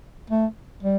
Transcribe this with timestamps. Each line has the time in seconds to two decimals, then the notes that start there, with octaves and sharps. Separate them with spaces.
0.30 A3
0.83 G3